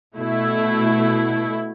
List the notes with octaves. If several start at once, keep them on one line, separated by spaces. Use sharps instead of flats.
B2 A3 E4